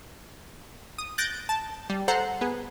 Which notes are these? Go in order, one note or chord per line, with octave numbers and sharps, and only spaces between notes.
D#6
F#6 G6 A6 A#6 D7
A5
G3
A4 C5 F#5 A#5
B3 G#4